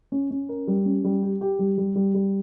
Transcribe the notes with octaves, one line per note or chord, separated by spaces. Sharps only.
C#4
C#4
A#4
G3
C#4
G3
G4
G4
G3
G3
G3
G3